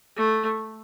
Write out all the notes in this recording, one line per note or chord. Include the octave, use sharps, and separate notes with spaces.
A3